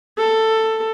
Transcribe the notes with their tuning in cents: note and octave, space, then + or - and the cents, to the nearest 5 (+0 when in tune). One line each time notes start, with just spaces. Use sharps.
A4 +10